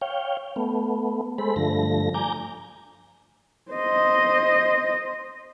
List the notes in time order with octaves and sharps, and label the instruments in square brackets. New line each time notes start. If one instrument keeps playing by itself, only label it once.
[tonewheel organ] C#5 F5 G5
A3 B3
G#3 A4 C5 B5
G2 D3 F3 A3 A#6
G#5 A#5 D6 G6
[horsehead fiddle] C5 D#5